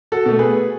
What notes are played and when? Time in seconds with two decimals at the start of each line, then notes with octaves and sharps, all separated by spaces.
0.12 F#4 A4
0.26 B2 A3
0.39 G#4 B4